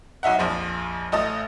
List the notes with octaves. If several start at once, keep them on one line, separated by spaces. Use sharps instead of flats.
B1 D#4 E5 F#5
A#1 F2 F3
A1 A4 D#5 A5